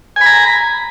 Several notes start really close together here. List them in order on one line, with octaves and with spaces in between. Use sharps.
G#5 B5 A#5